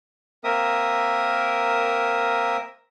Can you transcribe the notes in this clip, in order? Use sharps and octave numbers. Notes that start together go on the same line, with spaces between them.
A#3 C4 A#4 E5 D#6